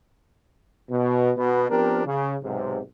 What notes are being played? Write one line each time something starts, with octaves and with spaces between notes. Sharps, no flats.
B2
B2 B3
F3 B3 C4 D4 G4 A#4
C#3
B1 G#2 C3